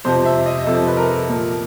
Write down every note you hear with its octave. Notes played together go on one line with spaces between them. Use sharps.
F2 C3 F3 C5
E5
D#5
F2 C3 F3 A4
B4
A#4
A#2 F3